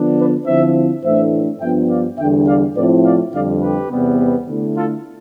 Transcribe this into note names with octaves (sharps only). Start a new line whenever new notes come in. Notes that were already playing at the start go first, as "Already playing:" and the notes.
Already playing: D3 F3 B3 D4
B4 D5
D3 F3 C4 E4 C5 E5
A2 E3 A3 D4 C5 E5
G2 F3 B3 D4 E5 G5
D5 F5
E2 D3 G3 D4 E5 G5
D5 F5
A2 F3 C4 E4 B4 D5
D5 F5
F2 D3 G3 D4 D5 F5
G4 B4
E2 C3 G3 B3
D3 A3 E4
F4 A4